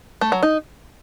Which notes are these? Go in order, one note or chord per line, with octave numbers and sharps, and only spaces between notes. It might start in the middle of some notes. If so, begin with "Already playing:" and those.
A3
F#3
D#4